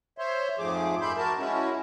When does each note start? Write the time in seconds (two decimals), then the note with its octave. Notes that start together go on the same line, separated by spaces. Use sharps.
0.18 C5 C#5 E5 C6
0.59 F2 G#2 F3 A3 G#4 D6
1.02 F#2 G#3 E5 B5 C6 G6
1.17 F#4 A#4 A5
1.39 G#3 C#4 E4 F#4